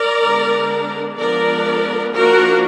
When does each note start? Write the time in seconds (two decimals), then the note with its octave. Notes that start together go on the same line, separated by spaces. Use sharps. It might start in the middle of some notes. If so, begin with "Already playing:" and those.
Already playing: A#4 D5
0.23 D3 G#3 B3 D4
1.18 F3 G#3 B3 D4 A#4 D5
2.13 F3 A#3 D4 F#4 A#4